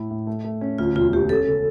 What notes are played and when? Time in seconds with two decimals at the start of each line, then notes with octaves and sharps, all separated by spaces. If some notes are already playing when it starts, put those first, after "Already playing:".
Already playing: A2 E4
0.11 A2
0.27 A3
0.44 A3
0.61 C#4
0.78 D2 F4
0.95 E1 F4
1.13 D2 G4
1.29 C#4 A4
1.47 C#3